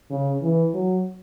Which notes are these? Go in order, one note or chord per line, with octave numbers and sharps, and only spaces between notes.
C#3
E3
F#3